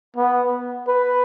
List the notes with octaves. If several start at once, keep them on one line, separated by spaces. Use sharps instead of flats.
B3
B4